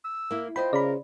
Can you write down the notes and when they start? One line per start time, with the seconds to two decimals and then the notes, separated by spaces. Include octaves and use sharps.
0.05 E6
0.31 A#3 E4
0.56 F4 C5 D#5 G5 B5
0.73 C#3 A#4 D5 B5